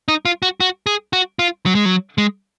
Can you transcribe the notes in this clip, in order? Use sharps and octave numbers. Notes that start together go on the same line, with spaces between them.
D#4
F4
F#4
F#4
G#4
F#4
F4
F#3
G#3
F#3
G#3